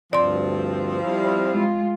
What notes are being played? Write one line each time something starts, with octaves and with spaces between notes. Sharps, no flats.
D2 G2 F3 C4 D5 C6
G3 E4 F5
G#3 F4